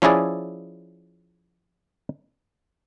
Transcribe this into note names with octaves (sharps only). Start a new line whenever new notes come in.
F3 C#4 E4 G#4 D5